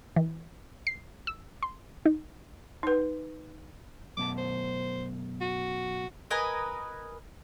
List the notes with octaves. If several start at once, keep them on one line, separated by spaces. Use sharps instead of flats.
E3
C7
E6
C6
D#4
D#4 B4
F#2 B2 A5 D6
C5
F#4
A#4 B4 D#5 G#5